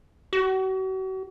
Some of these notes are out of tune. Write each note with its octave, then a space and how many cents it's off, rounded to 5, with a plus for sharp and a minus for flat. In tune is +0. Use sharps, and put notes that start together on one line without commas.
F#4 +40